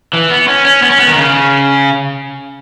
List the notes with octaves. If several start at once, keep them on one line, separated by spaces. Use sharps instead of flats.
E3
B3
C#4
C#4
B3
C#4
B3
D#3
C#3